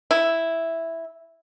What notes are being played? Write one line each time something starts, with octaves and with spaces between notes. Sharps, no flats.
E4